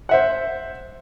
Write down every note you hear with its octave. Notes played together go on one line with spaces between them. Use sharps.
C5 E5 F#5